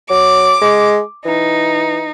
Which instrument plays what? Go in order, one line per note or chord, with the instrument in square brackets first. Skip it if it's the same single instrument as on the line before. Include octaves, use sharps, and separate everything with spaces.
[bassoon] F#3 [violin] D6
[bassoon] G#3
[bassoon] E3 [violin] D#4